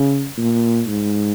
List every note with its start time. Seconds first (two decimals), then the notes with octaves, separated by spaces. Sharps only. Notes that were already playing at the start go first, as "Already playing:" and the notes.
Already playing: C#3
0.37 A#2
0.87 G#2